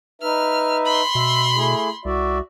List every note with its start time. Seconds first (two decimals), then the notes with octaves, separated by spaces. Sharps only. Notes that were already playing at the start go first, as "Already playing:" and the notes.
0.22 D#4 B4 E5 F6
0.85 B5 C6
1.15 B2 E5
1.56 A3 E4 G#4
2.05 C2 F#4 D5 E5